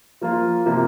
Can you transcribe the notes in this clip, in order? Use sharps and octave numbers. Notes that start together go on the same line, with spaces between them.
F3 A#3 F4
C3 F3 A#3